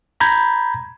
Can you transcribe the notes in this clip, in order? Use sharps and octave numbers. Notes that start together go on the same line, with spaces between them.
A#5 B5 G6 G#6